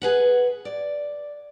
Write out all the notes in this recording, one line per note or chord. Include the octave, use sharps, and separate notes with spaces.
G#4 B4 F#5
D5